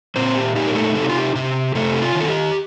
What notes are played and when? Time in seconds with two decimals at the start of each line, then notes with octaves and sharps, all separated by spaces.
0.16 A#2 C4 C5
0.35 G4
0.56 D#4 G4
0.67 A#4
0.75 A3 A4
0.95 C3 A4
1.02 G4
1.09 F4
1.17 G4
1.35 C3 G4
1.75 C3 A3 A4
1.93 G4
2.02 F4
2.15 D#3
2.21 A4
2.28 G4